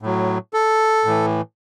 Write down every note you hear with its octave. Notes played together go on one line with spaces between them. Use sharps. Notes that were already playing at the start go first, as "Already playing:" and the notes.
A2 F#3
A4
A2 E3